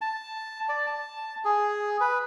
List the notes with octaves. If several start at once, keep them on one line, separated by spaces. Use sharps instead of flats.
A5
D5
A5
G#4
B4